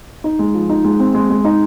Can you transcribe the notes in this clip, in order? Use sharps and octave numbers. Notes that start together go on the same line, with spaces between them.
D#4
G#3
F3
D#4
G#3
C4
G#3
G#3
D#4